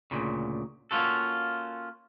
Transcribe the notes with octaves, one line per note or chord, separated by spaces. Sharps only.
D2 A#2 C#3
A#3 C#4 F4 F#4 A4